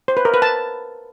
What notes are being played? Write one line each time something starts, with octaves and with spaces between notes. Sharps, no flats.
C5
B4
A#4
B4
A5